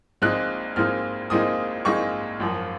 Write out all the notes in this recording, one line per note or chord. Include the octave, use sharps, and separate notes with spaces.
A#1 A#2 G#3 C4 D#4 F#6
A#1 A#2 G#3 C4 D#4 F6
A#1 A#2 G#3 C4 D#4 D#6
A#1 A#2 G#3 C4 D#4 C#6
G#1 F#2 F3